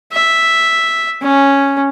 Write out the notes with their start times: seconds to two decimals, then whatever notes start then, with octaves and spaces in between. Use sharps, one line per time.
0.12 E5
1.22 C#4